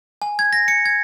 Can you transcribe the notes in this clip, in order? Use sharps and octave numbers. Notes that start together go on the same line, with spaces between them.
G#5
G#6
A#6
C#7
G#6